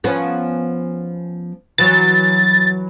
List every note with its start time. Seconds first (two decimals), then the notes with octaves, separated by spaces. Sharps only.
0.04 F3 B3 C#4
1.78 E3 F#3 A6